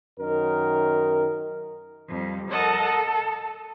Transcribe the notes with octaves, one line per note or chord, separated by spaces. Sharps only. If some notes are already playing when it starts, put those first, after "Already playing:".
F#2 D#3 A#4
F2 G3
A4 A#4 D#5 F#5 A5
A4